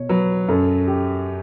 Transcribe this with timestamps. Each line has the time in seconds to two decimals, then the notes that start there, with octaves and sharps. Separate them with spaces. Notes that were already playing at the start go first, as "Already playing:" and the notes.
Already playing: B2 C#5
0.09 F#3 B4
0.48 F#2 A4
0.87 G4